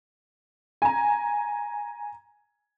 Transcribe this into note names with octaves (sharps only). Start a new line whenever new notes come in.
G#5 A#5